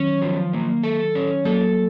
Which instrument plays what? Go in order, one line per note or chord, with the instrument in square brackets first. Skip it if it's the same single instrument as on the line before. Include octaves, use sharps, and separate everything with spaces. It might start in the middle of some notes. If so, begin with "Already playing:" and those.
Already playing: [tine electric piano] D#3 F#3 [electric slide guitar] C#4
[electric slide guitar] F3
A#3
A4
C#4
[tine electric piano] F#3 A#3 [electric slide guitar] A4